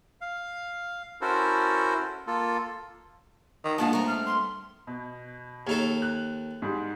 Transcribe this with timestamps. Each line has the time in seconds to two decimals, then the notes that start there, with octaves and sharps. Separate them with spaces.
0.21 F5
1.21 C#4 E4 F#4 A4 A#4 C5
2.27 A#3 F4 A4
3.64 D#3
3.78 A#2 G#3 A#3 B3 D4 F4 F#5 A5
3.93 G3 A3 C4 A#5 C#6
4.08 F6
4.26 C6
4.87 B2
5.67 D#2 D#4 A4 C#5
6.02 F#6
6.62 G#2 G3